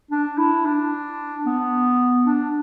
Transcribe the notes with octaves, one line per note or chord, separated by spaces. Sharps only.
D4
E4
D4
B3
D4